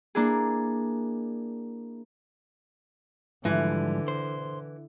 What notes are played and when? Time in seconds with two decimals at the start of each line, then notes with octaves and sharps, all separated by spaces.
0.15 A#3 D4 E4 G#4
3.45 G#2 D3 E3 F3 G3
4.08 C5